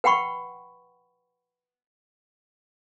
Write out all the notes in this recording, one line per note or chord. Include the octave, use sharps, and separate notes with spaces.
B4 F#5 G5 B5 C#6